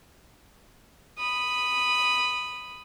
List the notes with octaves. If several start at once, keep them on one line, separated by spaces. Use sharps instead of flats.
B5 D#6